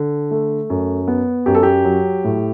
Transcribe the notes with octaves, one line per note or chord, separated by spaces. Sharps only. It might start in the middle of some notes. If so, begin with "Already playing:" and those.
Already playing: D3
A3
F#2
B3
F#2 G4
A4
G4
F#3
A2